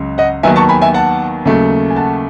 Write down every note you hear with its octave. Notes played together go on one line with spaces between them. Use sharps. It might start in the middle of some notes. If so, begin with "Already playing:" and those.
Already playing: C#2 C#3 F#3
D#5 F#5
D#2 D#3 F#3 B3 E5 G#5
A5 C#6
G#5 B5
E5 G#5
F#5 A5
D#2 C#3 F#3 A3
G#5
F#5 A5